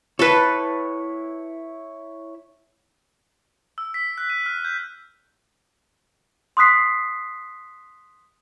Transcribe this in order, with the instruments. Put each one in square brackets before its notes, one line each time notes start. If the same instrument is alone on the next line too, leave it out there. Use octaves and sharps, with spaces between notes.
[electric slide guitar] E4 C#5 [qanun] A4 B4
[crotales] E6
B6
F#6
D#7
F6
G6
[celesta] C6 D#6 F#6 B6 C7